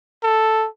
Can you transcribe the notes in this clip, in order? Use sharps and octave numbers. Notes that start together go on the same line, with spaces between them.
A4